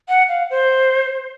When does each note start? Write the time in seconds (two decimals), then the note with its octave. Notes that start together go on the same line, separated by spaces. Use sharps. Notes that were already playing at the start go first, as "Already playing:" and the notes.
0.09 F#5
0.29 F5
0.50 C5